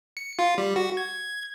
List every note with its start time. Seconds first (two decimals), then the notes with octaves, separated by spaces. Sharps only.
0.17 C#7
0.39 F4
0.58 G3
0.76 F#4
0.97 G#6